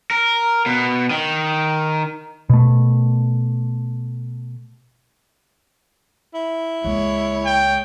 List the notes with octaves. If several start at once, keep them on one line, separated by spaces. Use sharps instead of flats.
A#4
B2
D#3
B2 A3
E4
C#2 G#3 A#3 C#5
G5